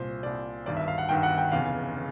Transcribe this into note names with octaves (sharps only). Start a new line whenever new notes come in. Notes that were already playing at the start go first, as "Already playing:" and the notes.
Already playing: C2 A#2 C5
C2 A#2 D5
G1 G2 D#3 D5
E5
F5
F#5
G1 G2 D#3 G5
F#5
G5
F1 E2 C#3 F5
C#3